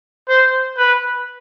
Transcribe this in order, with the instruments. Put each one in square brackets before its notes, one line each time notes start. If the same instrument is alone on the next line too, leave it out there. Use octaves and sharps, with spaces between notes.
[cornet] C5
B4